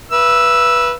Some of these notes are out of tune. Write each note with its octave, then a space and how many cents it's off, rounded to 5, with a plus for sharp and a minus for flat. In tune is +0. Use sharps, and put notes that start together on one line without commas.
B4 -15 E5 +35 E6 +0